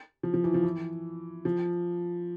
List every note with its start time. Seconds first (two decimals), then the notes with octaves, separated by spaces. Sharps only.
0.23 F3
0.34 F3
0.44 E3
0.54 F3
0.64 E3
1.45 F3